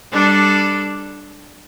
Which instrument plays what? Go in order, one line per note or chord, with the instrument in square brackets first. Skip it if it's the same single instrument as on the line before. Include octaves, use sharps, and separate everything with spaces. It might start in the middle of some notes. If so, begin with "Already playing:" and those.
[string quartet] G3 D4 A4 D5